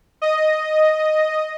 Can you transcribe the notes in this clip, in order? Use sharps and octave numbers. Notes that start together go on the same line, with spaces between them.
D#5